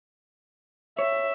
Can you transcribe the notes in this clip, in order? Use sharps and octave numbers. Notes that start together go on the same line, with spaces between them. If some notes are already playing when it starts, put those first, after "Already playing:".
C#5 E5